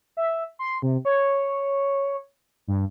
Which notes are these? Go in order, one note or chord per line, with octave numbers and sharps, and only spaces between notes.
E5
C6
C3
C#5
G2